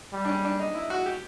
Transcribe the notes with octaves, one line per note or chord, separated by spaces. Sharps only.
G3
D4
C#4
D4
D#4
E4
F#4
G4